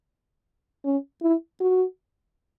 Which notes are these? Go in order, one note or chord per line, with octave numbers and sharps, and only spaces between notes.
C#4
E4
F#4